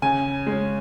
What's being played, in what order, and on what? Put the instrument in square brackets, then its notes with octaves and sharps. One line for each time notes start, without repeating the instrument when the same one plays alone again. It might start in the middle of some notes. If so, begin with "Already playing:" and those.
[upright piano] C#3 G#5
G#3 C#4